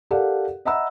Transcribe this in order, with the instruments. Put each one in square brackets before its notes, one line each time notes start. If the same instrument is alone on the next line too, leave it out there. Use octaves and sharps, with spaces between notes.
[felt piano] G4 A4 A#4 D5 F5 F#5
D#5 E5 F#5 A#5 B5 E6